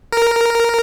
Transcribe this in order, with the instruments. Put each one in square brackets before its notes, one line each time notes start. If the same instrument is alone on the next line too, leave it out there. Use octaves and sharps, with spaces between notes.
[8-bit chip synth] A#4